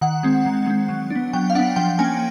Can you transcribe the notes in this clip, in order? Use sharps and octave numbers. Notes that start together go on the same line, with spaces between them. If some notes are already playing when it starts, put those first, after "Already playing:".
D#3 F#5
G#3 C4
D#3
G#3 C4
F#3
D4
B3
F#3 G5
F5
B3 D4 F#5
F3 G5
A#3 C#4 G#5